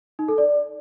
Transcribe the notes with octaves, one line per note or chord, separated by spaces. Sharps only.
D#4
A4
D5